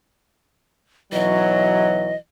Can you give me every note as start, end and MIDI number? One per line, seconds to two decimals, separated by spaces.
1.13 2.15 35
1.13 2.15 52
1.13 2.15 54
1.13 2.15 75